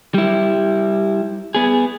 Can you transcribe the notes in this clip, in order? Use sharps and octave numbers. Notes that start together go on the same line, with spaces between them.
G3 E4
B3 G#4